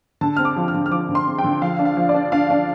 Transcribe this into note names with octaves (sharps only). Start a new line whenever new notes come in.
D3 A5
C4 F6
D6
F3
F6
D3
F6
F3 D6
D3
C6
C4
G5
D3
F3 F5
D4
F5
F3
D5
D4
D4 F5
D4